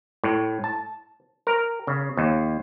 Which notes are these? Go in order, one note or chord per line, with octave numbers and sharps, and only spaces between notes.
A2
A5
A#4
C#3
D#2